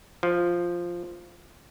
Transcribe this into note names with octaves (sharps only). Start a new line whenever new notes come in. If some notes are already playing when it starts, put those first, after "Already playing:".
F3